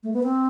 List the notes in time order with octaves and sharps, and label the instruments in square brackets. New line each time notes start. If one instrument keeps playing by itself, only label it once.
[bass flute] A3
B3
C4